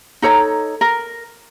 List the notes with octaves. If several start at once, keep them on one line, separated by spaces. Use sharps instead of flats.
D#4 A4 C#5 A#5
A#4